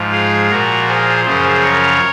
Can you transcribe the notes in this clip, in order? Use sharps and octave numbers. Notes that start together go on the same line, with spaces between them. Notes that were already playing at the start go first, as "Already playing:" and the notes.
Already playing: G#2 F3
F4 G#4
A#2 F3 F#4 A#4
G#4 C5
F#2 C#3 F3 G#4 C5
A#4 C#5